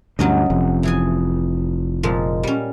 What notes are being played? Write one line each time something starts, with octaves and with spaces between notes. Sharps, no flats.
D2 G2 F#3 C#4 D#5
F1 F2
E3 G#4 G#5
A#2 F3 G#3
G3 C#4